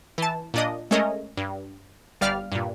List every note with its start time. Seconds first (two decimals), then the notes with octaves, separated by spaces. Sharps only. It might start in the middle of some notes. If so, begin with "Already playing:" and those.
0.18 E3 A5
0.54 A#2 D4 D#5
0.91 G#3 A3 C#4 A#4 D#5
1.37 G2
2.21 G1 G3 D5 F5 F6
2.52 G2 A#2